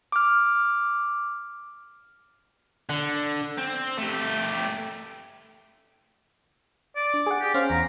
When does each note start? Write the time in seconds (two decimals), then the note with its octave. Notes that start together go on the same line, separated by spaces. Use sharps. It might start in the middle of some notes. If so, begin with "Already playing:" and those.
0.12 D6 F6
2.89 D3
3.58 C4
3.98 A3 G4
6.96 D5
7.14 D4
7.26 G#4 F#5
7.41 G4
7.54 C#4 C5 F5
7.70 E2 A#5